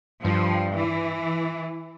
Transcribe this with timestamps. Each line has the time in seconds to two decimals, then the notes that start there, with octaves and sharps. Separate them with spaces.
0.25 G2 F3
0.74 E3